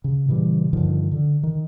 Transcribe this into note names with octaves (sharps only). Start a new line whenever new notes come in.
C#3
A#2 C#3 E3 G3
G2 D3 D#3 F3
D3
D#3